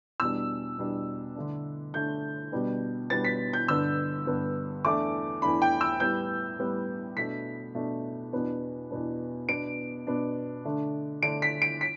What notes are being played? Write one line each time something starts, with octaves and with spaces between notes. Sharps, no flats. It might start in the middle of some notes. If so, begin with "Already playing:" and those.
E2 B2 G3 D4 E6
E2 B2 G3 D4
D3 A3 D4
D3 A3 D4 G6
B2 G3 B3 D4
B2 G3 B3 D4 A6
B6
G6
G2 D3 B3 D4 E6
G2 D3 B3 D4
E2 E3 A3 D4 D6
E2 E3 A3 D4 B5
G5
E6
A2 G3 B3 G6
A2 G3 B3
B2 A3 D4 B6
B2 A3 D4
E2 B2 B3 D4
E2 B2 B3 D4
B2 B3 D4 D7
B2 B3 D4
D3 A3 D4
D3 A3 D4 D7
B6
D7
B6